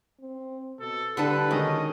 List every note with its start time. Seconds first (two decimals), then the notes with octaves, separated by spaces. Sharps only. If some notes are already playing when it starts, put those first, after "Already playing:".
0.20 C4
0.80 B2 A4
1.17 D3 G3 D4 A4 B4
1.51 B2 D#3 G#3 C#4 D#5